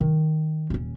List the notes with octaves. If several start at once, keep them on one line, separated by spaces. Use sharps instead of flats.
D#3
D#1 C#4